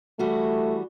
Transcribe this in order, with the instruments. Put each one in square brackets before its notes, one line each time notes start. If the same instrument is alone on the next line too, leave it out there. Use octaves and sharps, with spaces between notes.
[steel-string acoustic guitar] E3 G3 F#4 [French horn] A3